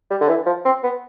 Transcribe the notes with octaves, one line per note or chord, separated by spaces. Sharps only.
G3
D3
E3
F3
C4
B3